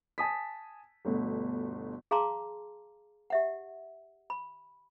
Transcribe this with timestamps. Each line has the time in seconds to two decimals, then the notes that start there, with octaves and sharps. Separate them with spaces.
0.18 G#5 A5 D#6 B6
1.05 G1 D2 B2
2.11 G#4 F5 A5 A#5 C6 D6
3.30 G4 E5 F#5
4.30 B5